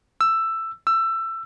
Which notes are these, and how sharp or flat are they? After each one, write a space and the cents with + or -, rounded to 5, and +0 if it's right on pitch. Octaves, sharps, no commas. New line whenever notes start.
E6 +10
E6 +20